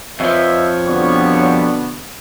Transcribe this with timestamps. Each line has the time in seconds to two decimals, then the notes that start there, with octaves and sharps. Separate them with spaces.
0.20 F2 F3 B4 C#5 D#5 E5
0.86 B2 D3 G3 B3 D5 C#6